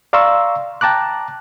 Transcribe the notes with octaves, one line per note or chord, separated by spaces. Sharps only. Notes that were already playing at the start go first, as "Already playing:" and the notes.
D5 F5 A#5 C6 C#6 E6
G5 A5 A#5 D6 F#6